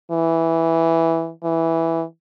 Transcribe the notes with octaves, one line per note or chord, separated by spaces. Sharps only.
E3
E3